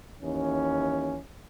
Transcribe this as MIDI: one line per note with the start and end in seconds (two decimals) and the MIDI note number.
0.22 1.19 39
0.22 1.19 52
0.22 1.19 61